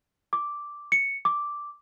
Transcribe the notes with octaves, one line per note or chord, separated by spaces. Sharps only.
D6
C#7
D6